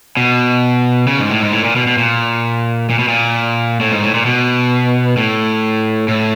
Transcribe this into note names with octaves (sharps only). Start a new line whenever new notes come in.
B2
C#3
G#2
A2
G#2
A2
A#2
B2
B2
A#2
A#2
B2
A#2
A2
G#2
A2
A#2
B2
A2
A2